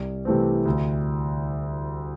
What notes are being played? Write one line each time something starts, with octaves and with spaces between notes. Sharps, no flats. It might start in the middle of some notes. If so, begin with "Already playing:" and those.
Already playing: C2
C3 E3 A3 C4
D2